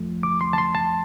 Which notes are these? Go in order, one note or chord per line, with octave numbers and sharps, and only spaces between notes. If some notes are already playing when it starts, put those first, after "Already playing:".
Already playing: F2 F3 A3
D6
C6
A5
C6
A5